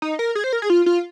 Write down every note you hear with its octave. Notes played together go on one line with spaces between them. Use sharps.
D#4
A#4
G#4
C5
A#4
G#4
F4
F4